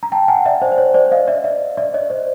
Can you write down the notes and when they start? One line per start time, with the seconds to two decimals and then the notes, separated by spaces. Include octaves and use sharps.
0.03 A#5
0.12 G5 A5
0.28 F#5 G#5
0.46 D5 E5
0.62 C5 D5
0.72 C5
0.78 C#5
0.94 C5 D5
1.12 D#5 F5
1.28 D5 E5
1.44 D5 E5
1.77 D5 E5
1.94 C#5 D#5
2.10 C5 D5